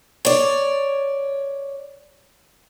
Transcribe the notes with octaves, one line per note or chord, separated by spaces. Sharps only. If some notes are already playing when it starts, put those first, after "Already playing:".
C#5 D5